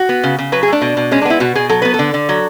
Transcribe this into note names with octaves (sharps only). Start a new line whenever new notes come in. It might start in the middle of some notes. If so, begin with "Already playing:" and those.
Already playing: F#4
B3
C#3
C#3
F#3 B4
G#4
A3 D4
B2
B2
G#3 C#4
D4
B3 E4
B2 F#4
B2 G#4
F#3 A4
B3 B4
A4
D3
D3
F#3